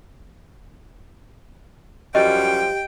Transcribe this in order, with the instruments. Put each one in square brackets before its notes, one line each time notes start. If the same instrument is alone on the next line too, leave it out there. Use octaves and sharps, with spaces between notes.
[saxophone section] F#2 F3 G3 [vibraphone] G4 [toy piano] D#5 [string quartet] G5